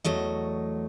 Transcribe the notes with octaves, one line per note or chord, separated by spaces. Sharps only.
E2 F#3 A3 D#5